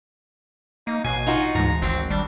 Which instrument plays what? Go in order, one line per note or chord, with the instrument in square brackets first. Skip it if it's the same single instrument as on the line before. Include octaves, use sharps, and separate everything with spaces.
[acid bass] A#3 [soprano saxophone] D#4
[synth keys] A1 F#6 C7 [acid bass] B2 [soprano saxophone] G#5
[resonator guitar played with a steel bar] D#4 F4 F#4
[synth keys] D2 E3 G#3 [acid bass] G#2 [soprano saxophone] A#5
[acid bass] G#1 [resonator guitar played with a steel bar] F#3 [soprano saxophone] C4
[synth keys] D#3 [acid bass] G3 [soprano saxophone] D4